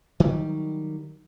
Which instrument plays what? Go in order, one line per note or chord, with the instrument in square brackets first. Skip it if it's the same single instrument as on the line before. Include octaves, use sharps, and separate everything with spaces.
[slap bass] D#3 F#3 G3